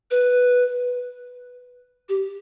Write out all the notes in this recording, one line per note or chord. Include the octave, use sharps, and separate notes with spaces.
B4
G4